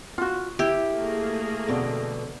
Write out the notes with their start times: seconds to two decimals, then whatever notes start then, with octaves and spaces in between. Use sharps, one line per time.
0.18 F4 F#4
0.59 E4 G4
0.92 A3 A#3 G#4
1.68 F2 B2 D3